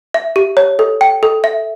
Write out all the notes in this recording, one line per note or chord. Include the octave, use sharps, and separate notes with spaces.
E5
G4
C#5
A4
G5
A4
E5